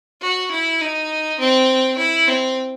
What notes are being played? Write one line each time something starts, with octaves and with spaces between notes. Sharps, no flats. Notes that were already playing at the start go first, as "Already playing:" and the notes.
F#4
E4
D#4
C4
E4
C4